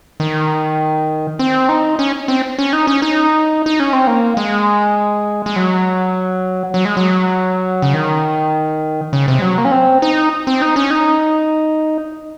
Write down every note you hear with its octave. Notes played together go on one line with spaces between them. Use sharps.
D#3
C4
D#4
C#4
C4
C#4
D#4
C#4
D#4
D#4
C#4
C4
A#3
G#3
G#3
F#3
F#3
G#3
F#3
C#3
D#3
C#3
C3
G#3
F#3
A#3
C#4
C4
D#4
C4
D#4
C#4
D#4